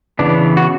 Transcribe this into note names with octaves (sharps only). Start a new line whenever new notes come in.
C#3 E3 B3 D4
F#4